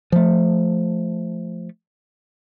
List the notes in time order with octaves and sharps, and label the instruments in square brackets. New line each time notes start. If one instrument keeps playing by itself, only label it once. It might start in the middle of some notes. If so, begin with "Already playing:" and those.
[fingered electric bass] F3 A3